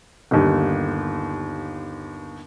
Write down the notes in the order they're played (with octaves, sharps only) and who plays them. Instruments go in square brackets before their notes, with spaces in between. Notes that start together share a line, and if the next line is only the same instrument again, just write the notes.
[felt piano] G1 D#2